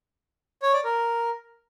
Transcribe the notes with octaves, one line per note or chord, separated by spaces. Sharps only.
C#5
D5
A#4